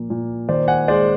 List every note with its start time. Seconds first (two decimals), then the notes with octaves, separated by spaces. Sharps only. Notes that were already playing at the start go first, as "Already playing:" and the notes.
Already playing: A#2 F3 A#3
0.10 A#2
0.49 D#3 C5 D5
0.68 F#5 G#5
0.88 G#3 C5 D5